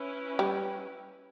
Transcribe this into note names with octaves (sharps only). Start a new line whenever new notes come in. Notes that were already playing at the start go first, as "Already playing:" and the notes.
Already playing: C#4 E4 B4
G3